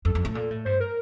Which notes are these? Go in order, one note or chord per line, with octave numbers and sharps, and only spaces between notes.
F2 A4
F2
A2
A#2
A2
G2 C5
A#4